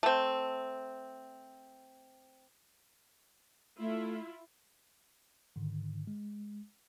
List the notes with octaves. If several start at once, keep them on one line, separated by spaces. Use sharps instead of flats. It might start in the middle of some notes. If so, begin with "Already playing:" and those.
A3 C4
A3 E4 F4
G#2 D3 D#3
G#3